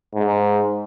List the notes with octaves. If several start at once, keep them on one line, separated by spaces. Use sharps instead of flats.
G#2